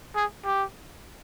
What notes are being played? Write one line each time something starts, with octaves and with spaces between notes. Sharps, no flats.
G#4
G4